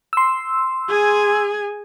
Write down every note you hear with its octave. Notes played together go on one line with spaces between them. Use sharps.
C6 E6
G#4 G#5